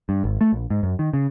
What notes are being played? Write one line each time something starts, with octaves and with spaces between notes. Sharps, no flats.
G2
G#1
A3
A#1
G#2
F#2
D#3
C#3